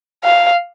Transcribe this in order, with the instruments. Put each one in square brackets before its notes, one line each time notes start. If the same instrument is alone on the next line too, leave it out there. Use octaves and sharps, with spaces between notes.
[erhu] F5